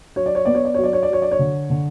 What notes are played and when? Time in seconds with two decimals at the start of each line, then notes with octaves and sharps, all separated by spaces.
0.16 F#3 C#5
0.26 D5
0.35 C#5
0.45 B3 D5
0.55 C#5
0.65 D5
0.74 F#3 C#5
0.83 D5
0.93 C#5
1.03 D5
1.09 F#3 C#5
1.22 D5
1.31 C#5
1.39 D3
1.70 D3